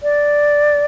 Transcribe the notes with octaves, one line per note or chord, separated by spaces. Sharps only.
D5